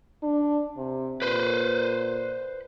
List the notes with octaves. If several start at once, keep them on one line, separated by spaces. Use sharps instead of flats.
D4
C3
A#2 B4 C5